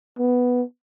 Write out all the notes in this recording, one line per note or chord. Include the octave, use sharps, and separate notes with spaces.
B3